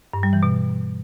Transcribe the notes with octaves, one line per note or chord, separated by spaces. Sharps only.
G2
G3
E3
B2